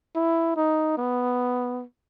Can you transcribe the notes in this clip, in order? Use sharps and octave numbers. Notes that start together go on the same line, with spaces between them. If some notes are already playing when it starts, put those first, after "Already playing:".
E4
D#4
B3